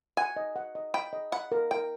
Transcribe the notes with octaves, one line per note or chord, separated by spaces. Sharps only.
F#5 G#5
D#5
F#5
D#5
G5 B5
D#5
F#5 B5
A#4
A#4 G5